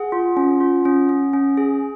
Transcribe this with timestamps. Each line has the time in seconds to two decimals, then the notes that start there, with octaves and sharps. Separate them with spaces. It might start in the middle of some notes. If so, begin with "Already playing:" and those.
Already playing: G#4 F#5
0.12 F4
0.37 C#4
0.61 F4
0.85 C#4
1.09 C#4
1.33 C#4
1.57 G#4